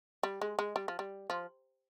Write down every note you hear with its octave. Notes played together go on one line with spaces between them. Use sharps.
G3
G#3
G#3
G3
F3
G3
F3